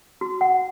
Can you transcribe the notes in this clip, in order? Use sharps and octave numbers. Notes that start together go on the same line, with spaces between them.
F#4
F#5